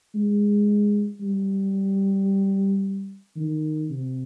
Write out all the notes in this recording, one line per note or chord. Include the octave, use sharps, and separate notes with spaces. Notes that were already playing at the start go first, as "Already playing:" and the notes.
G#3
G3
D#3
C3